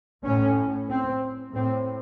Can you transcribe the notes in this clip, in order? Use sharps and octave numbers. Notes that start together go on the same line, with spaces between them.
A2 C#4
C4
A2 C4